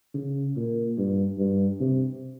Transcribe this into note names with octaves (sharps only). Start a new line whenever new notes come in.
C#3
A#2
G2
G2
C3